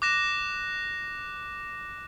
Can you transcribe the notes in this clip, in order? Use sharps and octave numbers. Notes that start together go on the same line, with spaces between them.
D6 F#6 A#6 E7